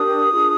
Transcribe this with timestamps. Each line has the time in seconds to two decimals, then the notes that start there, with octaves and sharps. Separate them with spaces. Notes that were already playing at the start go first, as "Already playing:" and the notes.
Already playing: D4 G4 A#4 D#6
0.32 D4 F4 G#4